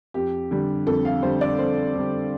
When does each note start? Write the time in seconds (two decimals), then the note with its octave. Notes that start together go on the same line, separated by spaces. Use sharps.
0.14 F2 G4
0.51 D3 G3
0.87 F2 A4
1.05 F5
1.23 D3 G3 C5
1.41 D5
1.59 F2 C5
1.95 D3 G3